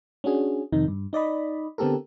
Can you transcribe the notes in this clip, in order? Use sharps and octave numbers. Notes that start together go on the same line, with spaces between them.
C#4 D4 F#4 G#4
F2 C3 D#3 D#4
G2
D#4 D5 D#5 B5
D3 B3 C4 G4 A4 A#4